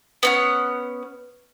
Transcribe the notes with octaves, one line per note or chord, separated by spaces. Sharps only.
B3 C#4 F#5